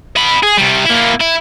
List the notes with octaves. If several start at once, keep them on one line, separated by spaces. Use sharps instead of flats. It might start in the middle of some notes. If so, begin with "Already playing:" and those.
D#5 B5
G#4
C3 G3
A#3 E4
E4